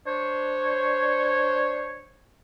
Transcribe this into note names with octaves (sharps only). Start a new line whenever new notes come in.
D4 C5 C#5